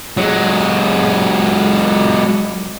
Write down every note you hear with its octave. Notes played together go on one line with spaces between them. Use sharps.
F#3 G#3